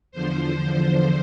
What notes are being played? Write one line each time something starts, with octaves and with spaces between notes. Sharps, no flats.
E2 D3 F3 C5